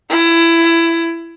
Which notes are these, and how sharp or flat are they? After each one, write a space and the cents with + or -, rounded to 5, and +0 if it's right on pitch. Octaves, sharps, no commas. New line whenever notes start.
E4 +20